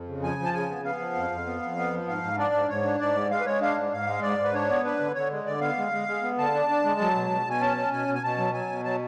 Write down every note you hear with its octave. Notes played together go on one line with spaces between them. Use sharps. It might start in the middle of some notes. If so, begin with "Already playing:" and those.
Already playing: F2
C#3
F3 G#5
F3
A5
C#3 G#5
B3
B3 F5
F3
F2
F2
B3
F2
B3
F3
G#2 F5
G#2
D4 D5
G#2
G#2 C#5
D4
G#2 D5
G#3
G#3 F5
B4
G#3 C#5
D4 F5
G#2
G#2 F5
G#3
G#2 D5
G#2
B4
D4 C#5
B3
D4 B4
D3
D3 C#5
G#3
D3 D5
B3 F5
G#3
G#3
G#3
B3
D3 A5
D4
D4
G#3
F#3
B2
B2
B2 G#5
C#4 A5
C#4
B2 G#5
B2
G#5
B2 A5
F#3
F#3 G#5
B2
F#3 A5